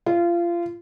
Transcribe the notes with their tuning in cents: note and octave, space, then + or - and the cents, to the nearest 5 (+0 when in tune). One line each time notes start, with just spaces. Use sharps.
F4 -25